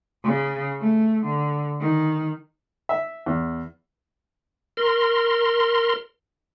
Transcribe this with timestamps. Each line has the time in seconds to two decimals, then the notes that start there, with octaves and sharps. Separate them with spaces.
0.24 C#3
0.80 A3
1.25 D3
1.80 D#3
2.89 E5
3.26 E2
4.77 A#4 C6